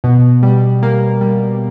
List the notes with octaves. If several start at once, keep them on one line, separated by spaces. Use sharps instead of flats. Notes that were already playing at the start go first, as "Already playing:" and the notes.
B2
G3
A#3
G3